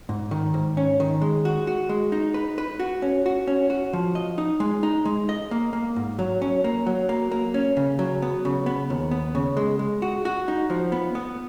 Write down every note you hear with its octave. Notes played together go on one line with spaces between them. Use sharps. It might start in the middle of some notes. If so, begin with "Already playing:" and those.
G#2
D#3
G#2
C#4
D#3
G#3
F#4
F#4
G#3
D#4
B4
B4
F#4
C#4
F#4
C#4
F#4
F3
D#5
D#4
G#3
D#4
G#3
D#5
A#3
A#3
G#2
F#3
C#4
A#3
F#3
A#3
A#3
C#4
C#3
F#3
B3
C#3
B3
D#2
B3
C#3
G#3
G#3
F#4
F#4
D#4
F3
B3
B3